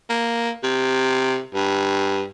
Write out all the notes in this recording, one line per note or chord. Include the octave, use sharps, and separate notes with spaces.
A#3
C3
G2